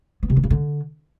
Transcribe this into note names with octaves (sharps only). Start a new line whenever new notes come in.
B3
C3
D#3
C#3
D3